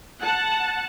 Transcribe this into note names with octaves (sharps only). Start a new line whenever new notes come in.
F#5 A5